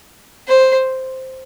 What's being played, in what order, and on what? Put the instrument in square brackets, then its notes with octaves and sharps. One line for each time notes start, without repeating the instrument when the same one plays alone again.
[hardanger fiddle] C5